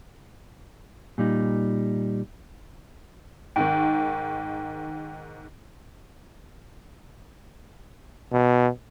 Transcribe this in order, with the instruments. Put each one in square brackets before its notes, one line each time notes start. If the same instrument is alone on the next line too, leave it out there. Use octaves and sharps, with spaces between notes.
[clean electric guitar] A#2 G3 D#4
[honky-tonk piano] G#2 D#3 [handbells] G5
[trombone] B2